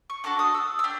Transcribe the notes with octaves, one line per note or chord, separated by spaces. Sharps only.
C#6
D4 F#4 A4 D6
D#6
E6
E6
D4 G4